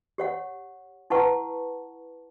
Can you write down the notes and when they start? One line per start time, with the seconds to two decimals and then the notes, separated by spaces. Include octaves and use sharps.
0.18 G4 C#5 F#5
1.10 E4 B4 F#5 A5 C#6